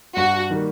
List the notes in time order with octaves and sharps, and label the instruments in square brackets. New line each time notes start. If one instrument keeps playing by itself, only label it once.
[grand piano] G2 [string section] F#4
[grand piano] D#3 G3 A#3